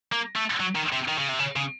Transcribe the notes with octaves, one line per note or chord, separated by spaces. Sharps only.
A#3
A3
F#3
D#3
C3
D#3
C#3
C3
C#3
C#3